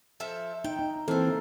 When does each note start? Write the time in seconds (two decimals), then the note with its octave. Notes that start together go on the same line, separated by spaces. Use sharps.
0.20 F3 A4 E5
0.64 D#4 G5
0.79 D#4
1.08 E3 A#3 C4 A4 C5